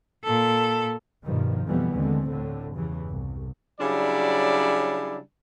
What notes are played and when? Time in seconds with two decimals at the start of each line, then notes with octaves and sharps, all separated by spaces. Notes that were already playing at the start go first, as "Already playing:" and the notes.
0.24 A#2 A4
1.24 G2 B2 D#3 F3
1.66 F2 B2 E3 G3 B3
1.94 D#2 D3 G#3 A3 C4
2.31 D2 A2 D3
2.75 E2 G2 C#3 E3
3.09 C2
3.80 C#3 F#3 G3 D4 E4 D5